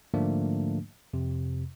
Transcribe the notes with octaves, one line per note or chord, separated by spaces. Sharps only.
G#2 D3 F3 A3 A#3 D4
F2 C3